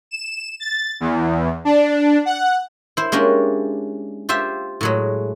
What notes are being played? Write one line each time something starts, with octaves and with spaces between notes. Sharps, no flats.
E7
A6
E2
D4
F#5
E4 C5
G#3 A#3 C#4 D4 G4
F4 G4 C5 E5
A2 F#3 G#3